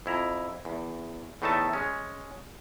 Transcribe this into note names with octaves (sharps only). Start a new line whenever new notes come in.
F2 E4 A#5
E2
E2 A2 A3 D#4 E5 A5
G#3 C#4